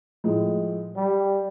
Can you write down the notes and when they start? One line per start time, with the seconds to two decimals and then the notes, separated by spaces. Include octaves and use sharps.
0.24 A2 F3 G#3
0.96 G3